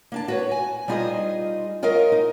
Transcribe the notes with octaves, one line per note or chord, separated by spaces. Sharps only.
A#3 D4 A5
F#4 B4 C#5
G#5
G3 D#4 F4 G#4 C5 D#5
F4 A#4 C#5 D#5 F5
D#4